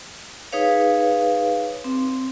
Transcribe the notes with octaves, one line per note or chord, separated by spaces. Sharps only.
D#4 G#4 B4 C#5 F5
C4